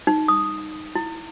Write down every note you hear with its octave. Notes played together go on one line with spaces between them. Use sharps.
D#4
D#6
E4